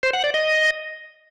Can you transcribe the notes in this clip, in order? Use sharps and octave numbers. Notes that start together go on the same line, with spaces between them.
C5
F#5
D5
D#5